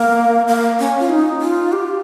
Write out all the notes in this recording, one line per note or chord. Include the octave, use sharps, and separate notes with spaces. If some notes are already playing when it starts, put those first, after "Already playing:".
Already playing: A#3
A#3
C#4
F4
D#4
F4
G4